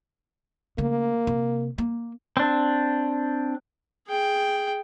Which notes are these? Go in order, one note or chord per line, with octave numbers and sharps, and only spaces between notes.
C#3 A3 A#3
C3
A#3
C4 D4
G#4 G5